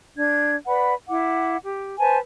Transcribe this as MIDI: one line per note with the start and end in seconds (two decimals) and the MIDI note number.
0.17 0.55 62
0.17 0.55 92
0.67 0.93 71
0.67 0.93 74
0.67 0.93 78
0.67 0.93 83
1.08 1.57 64
1.08 1.57 78
1.08 1.57 86
1.62 1.98 67
1.99 2.18 71
1.99 2.18 72
1.99 2.18 80
1.99 2.18 81